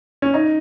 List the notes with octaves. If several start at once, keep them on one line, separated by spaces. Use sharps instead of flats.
C#4
D#4